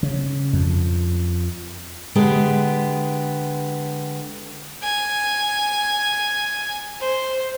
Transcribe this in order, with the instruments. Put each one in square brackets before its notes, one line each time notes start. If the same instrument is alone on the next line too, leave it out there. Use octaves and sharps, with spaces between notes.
[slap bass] C#3
F2
[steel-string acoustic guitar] D3 G#3 B3 G4
[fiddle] G#5
C5